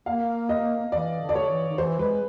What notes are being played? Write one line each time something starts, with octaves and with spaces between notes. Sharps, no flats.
A#3 F5
D#5
E3 D5
D3
D5
C#5
E3
D#3
E3 C5
G#3 B4